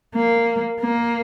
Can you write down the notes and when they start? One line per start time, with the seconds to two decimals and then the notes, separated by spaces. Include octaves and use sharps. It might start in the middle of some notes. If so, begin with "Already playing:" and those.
0.16 A#3
0.80 A#3